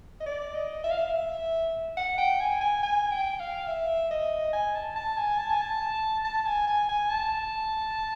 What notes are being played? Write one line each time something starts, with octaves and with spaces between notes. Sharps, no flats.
D#5
D5
D#5
E5
F5
E5
F#5
G5
G#5
G#5
G#5
G5
F5
E5
D#5
G#5
A5
A5
G#5
A5
G#5
A5
A5
G#5
G#5
G#5
A5